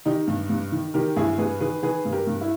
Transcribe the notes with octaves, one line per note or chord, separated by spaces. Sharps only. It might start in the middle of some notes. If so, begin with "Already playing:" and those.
D#3 D#4 G4
G2
G2
D#3
D#3 G4 A#4
G2 E4 G#4
G2 G#4 B4
D#3 G#4 B4
D#3 G#4 B4
G2
G4 A#4
G2
E4